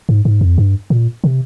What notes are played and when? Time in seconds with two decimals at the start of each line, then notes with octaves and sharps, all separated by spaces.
0.09 G#2
0.25 G#2
0.41 F2
0.58 G2
0.90 A#2
1.24 C3